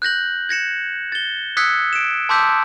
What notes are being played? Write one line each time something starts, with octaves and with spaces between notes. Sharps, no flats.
F#6 G6 A#6 F#7
G#6 A#6 C#7 E7
A6 G7
D#6 E6 F#6 G#6 B6 C#7
D7 E7
A5 C6 D6 E6 G6 B6